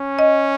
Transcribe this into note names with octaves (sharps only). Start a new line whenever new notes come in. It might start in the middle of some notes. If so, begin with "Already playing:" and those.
Already playing: C#4
D#5